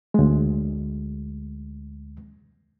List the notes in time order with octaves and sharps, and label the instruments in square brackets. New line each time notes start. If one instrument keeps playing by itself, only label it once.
[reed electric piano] D2 G#3